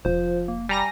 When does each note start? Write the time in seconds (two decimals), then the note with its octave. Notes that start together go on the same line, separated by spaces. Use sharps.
0.05 F1 F3 C5
0.48 A#3
0.69 G3 G#5 A#5 A#6